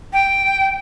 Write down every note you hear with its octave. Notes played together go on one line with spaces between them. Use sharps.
G5